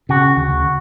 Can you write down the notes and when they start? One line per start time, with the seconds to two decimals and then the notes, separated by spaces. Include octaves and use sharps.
0.09 C#3 F#4
0.37 D2